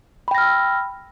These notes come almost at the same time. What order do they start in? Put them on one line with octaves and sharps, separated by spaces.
B5 G5 A#6 F6 E6